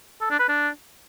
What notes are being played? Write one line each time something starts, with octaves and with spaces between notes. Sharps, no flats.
A4
D4
B4
D4